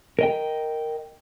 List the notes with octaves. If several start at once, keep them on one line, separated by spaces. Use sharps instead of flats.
A#4 D#5 G5